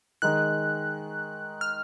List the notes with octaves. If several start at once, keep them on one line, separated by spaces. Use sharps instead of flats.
D#3 G#3 D#4 F#6
F6